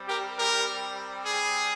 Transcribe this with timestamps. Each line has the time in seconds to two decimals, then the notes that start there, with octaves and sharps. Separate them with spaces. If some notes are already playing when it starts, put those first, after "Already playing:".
Already playing: G3 C4
0.09 G4 A#4
0.38 G4 A#4
1.25 G#4